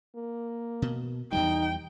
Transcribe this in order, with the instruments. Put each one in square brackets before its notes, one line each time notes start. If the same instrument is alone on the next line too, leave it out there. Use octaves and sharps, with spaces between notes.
[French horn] A#3
[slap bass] B2
[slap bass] E2 E3 G3 [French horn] D#4 [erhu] G5